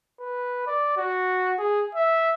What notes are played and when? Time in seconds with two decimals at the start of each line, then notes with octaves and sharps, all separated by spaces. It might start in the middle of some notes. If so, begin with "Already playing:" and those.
0.20 B4
0.67 D5
0.97 F#4
1.59 G#4
1.95 E5